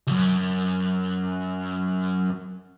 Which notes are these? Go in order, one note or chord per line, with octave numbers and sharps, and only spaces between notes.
C#2 F#2